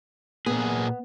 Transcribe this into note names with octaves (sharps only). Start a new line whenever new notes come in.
A#2 B3 G#4